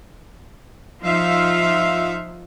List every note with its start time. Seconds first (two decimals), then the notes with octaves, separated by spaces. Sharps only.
1.03 F3 D#4 F4 E5 F5